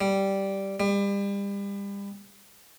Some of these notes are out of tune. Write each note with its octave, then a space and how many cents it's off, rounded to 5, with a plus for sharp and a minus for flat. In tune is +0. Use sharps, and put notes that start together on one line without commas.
G3 -5
G3 +35